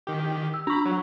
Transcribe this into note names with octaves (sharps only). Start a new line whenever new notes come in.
D#3 G4
E6
D4 A#5 B5 C#6
F#3